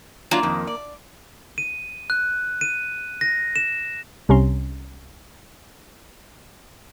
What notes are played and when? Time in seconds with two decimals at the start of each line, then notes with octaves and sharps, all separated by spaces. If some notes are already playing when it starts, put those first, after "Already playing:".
0.31 F#3 A#3 D4 F4
0.43 F2 D#3
0.67 D5
1.58 D#7
2.10 F#6
2.61 D#7
3.21 A#6
3.56 E7
4.29 C2 C3 C#4 A#5 C6